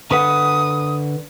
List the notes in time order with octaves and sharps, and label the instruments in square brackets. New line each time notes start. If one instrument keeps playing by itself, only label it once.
[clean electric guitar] D3 B4 F#5 [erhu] D#6